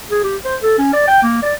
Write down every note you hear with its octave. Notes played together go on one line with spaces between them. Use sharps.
G#4
G4
C5
A4
C#4
D5
G5
A#3
D5